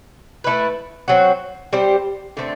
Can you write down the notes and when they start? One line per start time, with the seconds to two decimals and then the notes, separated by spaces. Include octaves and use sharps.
0.44 A3 E4 B4
1.08 F#3 C4 F#4
1.73 G3 C4 G4 C5
2.37 D3 A3 C4